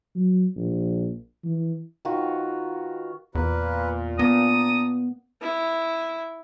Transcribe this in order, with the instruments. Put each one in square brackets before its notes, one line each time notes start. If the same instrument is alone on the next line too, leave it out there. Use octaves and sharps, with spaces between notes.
[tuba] F#3
A#1
E3
[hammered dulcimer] D#3 F4 F#4 B4
[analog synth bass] E2 [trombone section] A#2 [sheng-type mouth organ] A#3 B4
[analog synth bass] B3 [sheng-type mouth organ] D4 A#5 [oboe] D#6
[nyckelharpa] E4